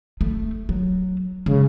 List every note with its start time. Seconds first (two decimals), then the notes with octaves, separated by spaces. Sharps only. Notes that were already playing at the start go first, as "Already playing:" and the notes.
0.21 A3
0.69 F#3
1.46 C#3 G#3